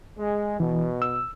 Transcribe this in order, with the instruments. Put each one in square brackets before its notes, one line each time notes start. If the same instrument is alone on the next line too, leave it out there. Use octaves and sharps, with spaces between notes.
[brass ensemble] G#3
[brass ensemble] B2 [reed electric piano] E3
[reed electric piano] E6